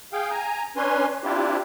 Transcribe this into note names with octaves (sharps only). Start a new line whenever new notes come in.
G#4 F5 G5
G#5 A#5
C#4 D4 B4 C#5 G#5 C6
C4 D4 E4 F4 G4